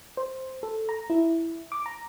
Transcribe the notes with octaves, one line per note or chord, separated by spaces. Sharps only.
C5
A4
A#5
E4
D6
A#5